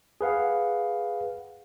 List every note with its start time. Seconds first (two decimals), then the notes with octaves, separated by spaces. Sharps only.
0.21 G#4 B4 F5 F#5